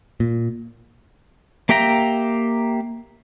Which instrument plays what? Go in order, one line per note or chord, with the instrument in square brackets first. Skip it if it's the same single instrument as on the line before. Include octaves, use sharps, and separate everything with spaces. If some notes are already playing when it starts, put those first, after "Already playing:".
[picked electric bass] A#2
[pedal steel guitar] A#3 G4 E5 G5 A#5